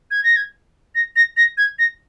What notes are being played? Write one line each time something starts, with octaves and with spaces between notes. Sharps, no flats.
G#6
A#6
G#6
A#6
A#6
A#6
G#6
A#6